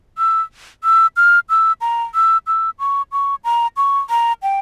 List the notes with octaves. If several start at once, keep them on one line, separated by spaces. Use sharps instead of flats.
E6
E6
F6
E6
A#5
E6
E6
C#6
C#6
A#5
C#6
A#5
G5